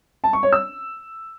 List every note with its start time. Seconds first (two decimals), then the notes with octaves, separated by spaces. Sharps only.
0.24 A5
0.33 C#6
0.43 C#5
0.53 E6